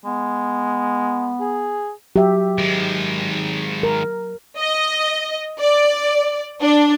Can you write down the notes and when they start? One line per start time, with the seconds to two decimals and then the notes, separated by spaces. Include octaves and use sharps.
0.05 G#3 B3
1.41 G#4
2.16 F#3 G4 E5
2.58 D#3 G#3
3.83 A#4
4.58 D#5
5.59 D5
6.61 D4